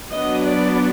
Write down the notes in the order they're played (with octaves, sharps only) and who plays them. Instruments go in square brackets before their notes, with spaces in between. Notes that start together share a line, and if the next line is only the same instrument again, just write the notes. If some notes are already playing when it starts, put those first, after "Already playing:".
[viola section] F#3 B3 D4 D#5
D5